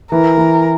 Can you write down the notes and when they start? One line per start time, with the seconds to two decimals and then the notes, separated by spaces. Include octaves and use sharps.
0.12 E3 A#4
0.37 E3